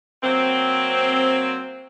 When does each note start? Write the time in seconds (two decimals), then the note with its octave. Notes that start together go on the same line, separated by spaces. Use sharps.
0.23 F#3 A#3 C4